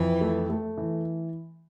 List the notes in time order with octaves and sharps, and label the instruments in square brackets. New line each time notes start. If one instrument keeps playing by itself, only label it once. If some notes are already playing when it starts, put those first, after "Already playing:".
Already playing: [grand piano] F2 [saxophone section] E3
[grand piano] A3
A3
E3